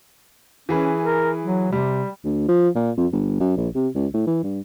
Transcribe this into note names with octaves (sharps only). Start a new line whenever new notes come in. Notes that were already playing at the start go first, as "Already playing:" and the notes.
E3 C#4 G#4 B4
A#4
F#3
C3 G3
D2
F3
A#2
F2
G1
F#2
A#1
C3
C#2
A2
E3
G2